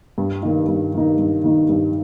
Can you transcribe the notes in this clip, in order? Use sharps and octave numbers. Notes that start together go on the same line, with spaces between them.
G2
D#3 A#3 D#4
G2
D#3 A#3 D#4
G2
D#3 A#3 D#4
G2